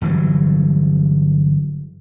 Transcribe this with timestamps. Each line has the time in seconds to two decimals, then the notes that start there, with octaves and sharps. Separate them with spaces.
0.01 G1 E3 F#3 G3